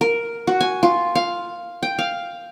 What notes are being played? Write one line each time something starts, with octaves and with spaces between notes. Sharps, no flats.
A#4
F#4
G#5
F4
F5
G5
F5